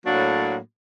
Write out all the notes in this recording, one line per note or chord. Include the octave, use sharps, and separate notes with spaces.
A2 F#3 A#3 D4 F#4